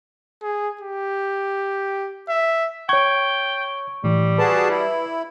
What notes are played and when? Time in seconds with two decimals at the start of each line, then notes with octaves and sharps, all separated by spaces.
0.42 G#4
0.81 G4
2.29 E5
2.89 C#5 G5 C#6 G#6
4.04 A2 E3 G3
4.38 F#4 G#4 B4 A5
4.69 E4